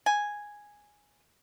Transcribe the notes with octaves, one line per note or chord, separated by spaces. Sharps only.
G#5